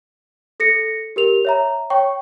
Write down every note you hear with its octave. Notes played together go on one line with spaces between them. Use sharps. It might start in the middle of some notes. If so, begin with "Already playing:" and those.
A4 A#6 C#7
G4 A#4 F7
C#5 E5 A#5
C#5 G5 C#6